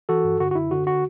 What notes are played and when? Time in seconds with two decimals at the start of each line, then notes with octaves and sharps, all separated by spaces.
0.09 E3 F#4 A4
0.24 G2
0.40 D3 F#4
0.51 F#4
0.55 F#2 E4
0.71 D3 F#4
0.87 F#4